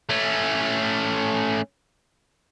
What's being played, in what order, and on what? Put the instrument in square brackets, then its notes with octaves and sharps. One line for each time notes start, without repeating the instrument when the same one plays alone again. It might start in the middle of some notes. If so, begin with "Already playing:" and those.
[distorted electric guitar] A3 C#4